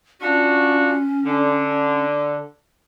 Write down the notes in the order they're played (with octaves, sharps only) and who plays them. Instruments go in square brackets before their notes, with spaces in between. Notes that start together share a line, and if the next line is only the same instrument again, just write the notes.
[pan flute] C#4 [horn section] D4 F4 F#4
[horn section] D3